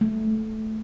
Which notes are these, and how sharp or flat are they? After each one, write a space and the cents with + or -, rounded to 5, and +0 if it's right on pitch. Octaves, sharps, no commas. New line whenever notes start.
A3 -10